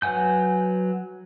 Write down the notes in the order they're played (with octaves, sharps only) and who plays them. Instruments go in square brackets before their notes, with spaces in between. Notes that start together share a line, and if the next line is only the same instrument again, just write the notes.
[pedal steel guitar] F#3 B4 F#5 G#5 G6